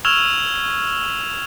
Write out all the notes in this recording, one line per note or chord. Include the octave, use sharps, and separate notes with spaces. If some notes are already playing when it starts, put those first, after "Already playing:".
C#6 E6 F6 G#6 E7 F7